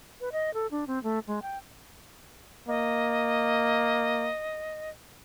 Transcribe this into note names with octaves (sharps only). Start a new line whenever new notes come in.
B4
D#5
A4
D4
C4
A3
G#3
G5
A#3 D#5